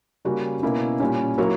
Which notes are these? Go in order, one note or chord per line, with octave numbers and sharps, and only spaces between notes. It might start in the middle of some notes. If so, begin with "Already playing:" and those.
C#3 G3 A#3 C#4 F#4
B2 A#3 C#4 E4
A#2 G3 C#4
F#3 A#3 E4 A#4 C#5